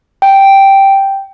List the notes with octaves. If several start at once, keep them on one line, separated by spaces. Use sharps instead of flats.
G5